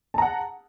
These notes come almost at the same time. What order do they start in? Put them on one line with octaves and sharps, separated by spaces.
A5 A#5 F#5